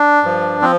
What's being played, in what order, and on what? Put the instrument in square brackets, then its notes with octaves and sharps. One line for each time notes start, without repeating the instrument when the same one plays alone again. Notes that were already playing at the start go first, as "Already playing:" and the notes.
Already playing: [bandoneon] D4
G2 F3
F3 C4